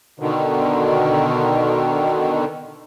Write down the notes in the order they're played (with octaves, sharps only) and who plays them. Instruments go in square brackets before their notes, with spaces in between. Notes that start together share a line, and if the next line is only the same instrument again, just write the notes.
[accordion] B2 D3 D#3